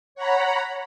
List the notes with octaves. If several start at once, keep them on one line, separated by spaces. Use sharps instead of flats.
C#5 F#5 A#5 B5